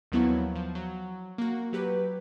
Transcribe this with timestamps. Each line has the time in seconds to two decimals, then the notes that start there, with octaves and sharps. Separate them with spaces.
0.12 D#2 F3 F#3 B3 E4 C#5
0.56 F3
0.75 F#3
1.38 A#3 F#4
1.73 F#3 G4 B4